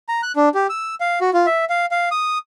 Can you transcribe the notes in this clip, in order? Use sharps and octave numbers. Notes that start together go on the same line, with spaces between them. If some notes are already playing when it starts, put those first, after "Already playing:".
A#5
F#6
D4
G4
E6
F5
F#4
F4
E5
F5
F5
D#6